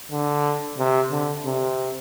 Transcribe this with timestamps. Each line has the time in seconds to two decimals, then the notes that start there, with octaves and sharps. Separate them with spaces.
0.11 D3
0.78 C3
1.12 D3
1.46 C3